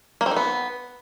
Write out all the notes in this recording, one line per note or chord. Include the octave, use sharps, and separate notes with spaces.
A#3
C4
D#4
B3